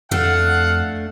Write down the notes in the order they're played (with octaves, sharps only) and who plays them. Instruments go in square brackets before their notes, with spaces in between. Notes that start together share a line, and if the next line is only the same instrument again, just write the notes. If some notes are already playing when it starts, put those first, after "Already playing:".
[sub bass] F2 [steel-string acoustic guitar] A3 D4 [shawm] F5 [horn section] F#5